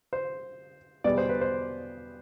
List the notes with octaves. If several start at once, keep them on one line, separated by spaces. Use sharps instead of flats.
C5
E2 B2 G3 B3 D5
C5
B4
C5